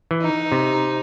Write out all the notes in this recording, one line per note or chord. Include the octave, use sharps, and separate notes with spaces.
E3
D#4
C3